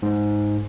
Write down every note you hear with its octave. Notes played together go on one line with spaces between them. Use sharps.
G#2